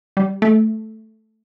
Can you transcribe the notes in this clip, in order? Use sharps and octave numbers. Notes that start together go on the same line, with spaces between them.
G3
A3